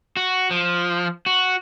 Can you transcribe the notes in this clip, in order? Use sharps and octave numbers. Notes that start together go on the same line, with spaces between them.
F#4
F3
F#4